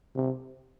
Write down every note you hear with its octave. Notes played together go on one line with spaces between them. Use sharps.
C3